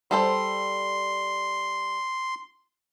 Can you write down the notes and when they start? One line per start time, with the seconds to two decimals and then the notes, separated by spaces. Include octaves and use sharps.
0.11 G3 A4 C5 C6